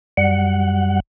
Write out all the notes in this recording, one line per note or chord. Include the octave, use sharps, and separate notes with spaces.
F#2 G3 F#5